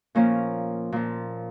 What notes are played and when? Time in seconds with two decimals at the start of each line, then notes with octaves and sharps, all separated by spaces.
0.15 A#2 F3 A#3 C#4
0.92 A#2 F3